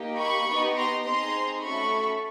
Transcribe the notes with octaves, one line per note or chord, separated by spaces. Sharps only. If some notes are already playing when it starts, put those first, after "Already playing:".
Already playing: A#3 D#4 G4
B5 C#6
B3 D#4 G4
A#5 C6
C4 D#4 G#4 A#5 C6
A3 C#4 F#4 A4 B5 C#6